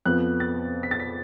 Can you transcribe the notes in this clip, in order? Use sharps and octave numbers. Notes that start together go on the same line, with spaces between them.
F2 F3 B3 F#6
A6
B6
A6
B6